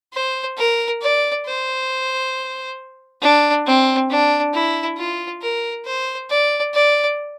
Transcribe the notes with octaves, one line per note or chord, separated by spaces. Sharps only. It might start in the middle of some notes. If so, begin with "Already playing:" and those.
C5
A#4
D5
C5
D4
C4
D4
E4
F4
A#4
C5
D5
D5